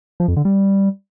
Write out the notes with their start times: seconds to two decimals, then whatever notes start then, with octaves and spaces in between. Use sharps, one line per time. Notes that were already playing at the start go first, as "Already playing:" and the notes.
0.20 F3
0.28 F2
0.37 D3
0.45 G3